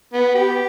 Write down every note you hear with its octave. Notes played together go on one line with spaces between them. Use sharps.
B3
G4